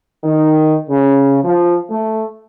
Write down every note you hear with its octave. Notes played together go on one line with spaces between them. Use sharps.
D#3
C#3
F3
A3